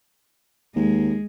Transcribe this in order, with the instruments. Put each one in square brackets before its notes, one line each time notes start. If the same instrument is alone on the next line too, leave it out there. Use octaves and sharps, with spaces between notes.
[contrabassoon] D#2 [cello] G#3